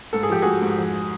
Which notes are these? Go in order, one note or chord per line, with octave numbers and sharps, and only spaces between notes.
G#2 A4
G#4
F3 G4
G#2 F#4 G#4
G#2
F2